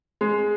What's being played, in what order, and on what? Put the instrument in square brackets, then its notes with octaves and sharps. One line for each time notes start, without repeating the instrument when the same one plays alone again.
[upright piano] G#3